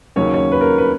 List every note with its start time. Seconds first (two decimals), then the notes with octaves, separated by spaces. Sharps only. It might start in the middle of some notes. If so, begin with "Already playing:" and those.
0.16 D#2 C#3 F#3 C#4 C#5
0.34 C#5
0.52 B4
0.61 A#4
0.78 B4